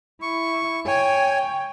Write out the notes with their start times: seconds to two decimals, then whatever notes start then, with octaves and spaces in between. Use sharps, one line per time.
0.22 E4 C#6
0.87 C#5 G5 G#5